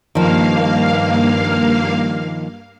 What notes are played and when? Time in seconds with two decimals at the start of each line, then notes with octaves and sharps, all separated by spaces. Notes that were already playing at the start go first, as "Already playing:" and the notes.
0.15 G2 D#3 F3 A#3 F5